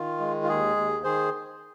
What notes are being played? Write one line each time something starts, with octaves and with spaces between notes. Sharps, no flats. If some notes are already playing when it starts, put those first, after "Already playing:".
Already playing: D#3 F4
G#3
F4
D#2 G#4
D#2
D#3 G#4 C5